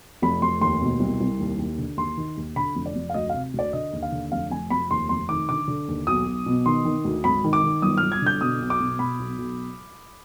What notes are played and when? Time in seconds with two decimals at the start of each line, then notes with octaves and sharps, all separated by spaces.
0.22 F1 B5
0.42 F1 C6
0.61 D#2 C6
0.81 B2
1.00 C2
1.21 C2
1.40 D#2
1.59 D#2
1.78 D3
1.97 D#2 C6
2.18 D#3
2.37 D#2
2.56 D3 B5
2.76 F1
2.86 D5
2.96 F1
3.10 F5
3.14 D2 D#5
3.29 C3 F5
3.54 D2 D5
3.73 D3 D#5
3.93 D#2
4.03 F5
4.12 D3
4.32 F1 F5
4.51 F1 G#5
4.70 F1 B5
4.91 D#2 C6
5.09 F1 C6
5.29 D#3 D6
5.49 D3 D6
5.68 D3
5.88 D#2
6.07 B1 D#6
6.27 B1
6.46 B2
6.66 D#3 C6
6.85 D#3
7.05 D2
7.24 G#1 B5
7.44 D#3
7.53 D6
7.63 D#3
7.82 G1 D#6
7.97 G1 F6
8.12 G#6
8.22 D3 G6
8.41 B2 D#6
8.61 B1
8.70 D6
8.80 B2
8.99 B2 B5
9.20 B1
9.38 B1